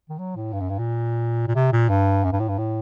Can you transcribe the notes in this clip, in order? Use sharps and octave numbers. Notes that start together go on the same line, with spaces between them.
D#3
F#3
A2
G2
F#2
G2
A#2
A#2
C3
A#2
G2
F#2
G2
A2
G2
A2